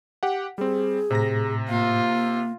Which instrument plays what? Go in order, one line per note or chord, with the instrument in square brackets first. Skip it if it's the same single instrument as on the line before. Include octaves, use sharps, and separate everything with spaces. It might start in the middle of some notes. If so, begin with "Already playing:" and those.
[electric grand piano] G4 F#5
[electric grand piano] G3 C4 [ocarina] G#4
[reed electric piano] A2 [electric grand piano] C3 A#5 A#6
[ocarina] A#3 [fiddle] F4